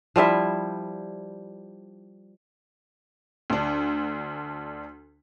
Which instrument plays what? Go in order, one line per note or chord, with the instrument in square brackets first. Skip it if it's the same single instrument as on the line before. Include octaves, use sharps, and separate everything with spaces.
[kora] F3 G3 E4 E5
[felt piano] D2 D4